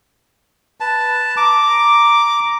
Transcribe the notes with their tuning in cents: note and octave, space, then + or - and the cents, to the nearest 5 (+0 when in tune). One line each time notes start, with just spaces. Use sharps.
B4 -5 A5 +0
A#5 +0 D6 +0